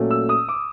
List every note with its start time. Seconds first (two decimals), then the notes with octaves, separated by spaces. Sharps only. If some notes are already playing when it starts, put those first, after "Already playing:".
Already playing: A#2 F#3 A3 C#4
0.11 E6
0.29 D#6
0.49 D6